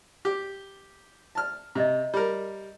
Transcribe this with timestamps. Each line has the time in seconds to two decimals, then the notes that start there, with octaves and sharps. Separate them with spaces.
0.25 G4
1.35 A5 F6
1.75 C3 D#5 E5 A#5
2.14 G3 A#4